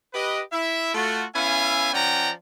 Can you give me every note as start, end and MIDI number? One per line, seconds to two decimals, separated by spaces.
0.14 0.40 67
0.14 0.40 71
0.14 0.40 75
0.53 0.94 64
0.53 0.94 76
0.95 1.24 57
0.95 1.24 65
0.95 1.24 66
1.36 1.92 59
1.36 1.92 61
1.36 1.92 64
1.36 1.92 76
1.36 1.92 77
1.36 1.92 80
1.94 2.30 53
1.94 2.30 61
1.94 2.30 74
1.94 2.30 78
1.94 2.30 79
1.94 2.30 82